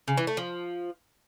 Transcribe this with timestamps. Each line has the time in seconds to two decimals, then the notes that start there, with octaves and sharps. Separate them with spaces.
0.08 C#3
0.17 E3
0.27 A3
0.37 F3